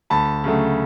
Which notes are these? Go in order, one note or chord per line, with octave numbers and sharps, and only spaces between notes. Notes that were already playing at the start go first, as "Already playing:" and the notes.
D2 A5 B5
C#3 F#3 A3